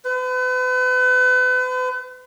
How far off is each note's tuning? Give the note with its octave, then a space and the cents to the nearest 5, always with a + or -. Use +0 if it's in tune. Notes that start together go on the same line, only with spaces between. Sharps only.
B4 +40